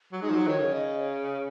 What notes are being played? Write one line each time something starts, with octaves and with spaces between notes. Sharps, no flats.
F#3
G#3 D#4
F3
F#3
D#3 C#5
C#3
D#5
C#5